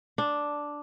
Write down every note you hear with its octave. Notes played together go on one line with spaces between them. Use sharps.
D4